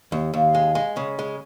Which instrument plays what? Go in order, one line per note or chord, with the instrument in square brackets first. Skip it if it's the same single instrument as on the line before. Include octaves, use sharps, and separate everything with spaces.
[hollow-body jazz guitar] D#2
[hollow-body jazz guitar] D#2 [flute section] F5
[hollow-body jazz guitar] G#3
G#3
C#3
G#3